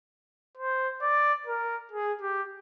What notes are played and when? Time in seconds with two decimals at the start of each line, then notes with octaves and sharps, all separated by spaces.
0.57 C5
1.02 D5
1.46 A#4
1.92 G#4
2.21 G4